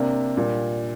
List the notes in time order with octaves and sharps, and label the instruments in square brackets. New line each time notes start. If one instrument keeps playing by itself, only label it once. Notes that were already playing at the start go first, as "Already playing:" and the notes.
Already playing: [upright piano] C3 A#3 D4
A#2 G3 D4